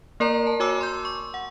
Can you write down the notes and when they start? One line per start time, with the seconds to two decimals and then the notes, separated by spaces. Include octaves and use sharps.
0.20 A#3 A#4 D5 A#5
0.47 A5
0.60 F#4 C#5 G#5 D6 E6
0.81 C6 G6
1.05 C#6
1.34 F#5